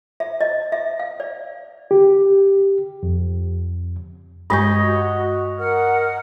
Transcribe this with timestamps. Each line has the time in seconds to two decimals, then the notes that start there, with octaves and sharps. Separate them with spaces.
0.20 E5
0.41 D#5
0.72 E5
0.99 F5
1.20 D5
1.91 G4
3.03 F2
4.50 G2 G#3 C#5 D#5 G6
4.81 F#4
5.59 A#4 F#5 F6